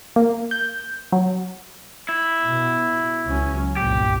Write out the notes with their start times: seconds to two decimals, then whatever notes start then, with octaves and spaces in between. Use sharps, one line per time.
0.16 A#3
0.51 G6
1.12 F#3
2.09 E4
2.45 B2
3.26 C#2 F#3 C#4
3.77 G1 C2 A#2 G4